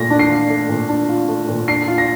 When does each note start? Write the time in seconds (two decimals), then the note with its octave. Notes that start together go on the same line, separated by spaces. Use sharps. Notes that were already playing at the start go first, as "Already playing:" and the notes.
Already playing: A#2 A3 F4 A#6
0.10 D4
0.19 C7
0.30 F4
0.49 A3
0.69 A#2
0.89 D4
1.09 F4
1.28 A3
1.49 A#2
1.68 D4 C7
1.87 F4
1.98 A#6